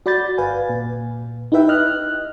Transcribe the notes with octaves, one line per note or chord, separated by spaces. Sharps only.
F#4 D5 B5 G6 A6
G1 B4 F5 G#5
A#2
D#4 E4 G4 B4 E5 G5
D#5 F6 F#6